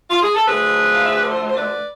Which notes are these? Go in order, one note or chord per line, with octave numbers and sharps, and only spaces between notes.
F4
G#4
A4
D2 D3 F3 A3 G#4 B4
F5
E5
D5
A4 C5
C5
B4 D5